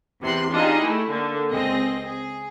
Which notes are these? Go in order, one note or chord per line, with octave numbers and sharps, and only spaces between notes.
E2 C3 C6 F#6
D4 D#4 F4 G4 G#4 D#5
A3 E4
D3 A#3
C#2 C4 G#4 D#5 A#6
G#4